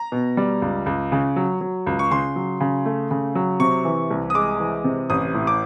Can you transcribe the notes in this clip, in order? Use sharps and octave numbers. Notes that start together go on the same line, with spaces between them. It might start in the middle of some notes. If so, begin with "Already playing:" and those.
Already playing: A#5
B2
G3
C#2
C#2
C#3
F#3
F#3
C#2
C#6
C#3 C6
F#3
C#3
A3
C#3
F#3
C3 C#6
E3
C2
D#6
G#3 D6
E3
C3
A1 D#6
A2
D6